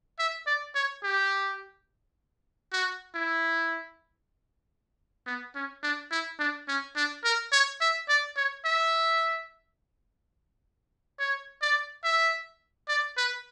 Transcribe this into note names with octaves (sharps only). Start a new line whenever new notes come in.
E5
D5
C#5
G4
F#4
E4
B3
C#4
D4
E4
D4
C#4
D4
A#4
C#5
E5
D5
C#5
E5
C#5
D5
E5
D5
B4